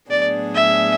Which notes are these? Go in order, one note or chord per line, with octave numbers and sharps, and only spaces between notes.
A2 F#3 B3 D4 G#4 D5
E5